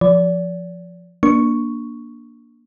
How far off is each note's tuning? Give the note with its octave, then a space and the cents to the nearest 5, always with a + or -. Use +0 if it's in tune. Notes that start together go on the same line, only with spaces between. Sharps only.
F3 +0 D5 -30
A#3 +20 D4 +0 C#6 +0